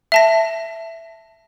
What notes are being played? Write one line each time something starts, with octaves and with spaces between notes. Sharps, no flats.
E5 A5 A#6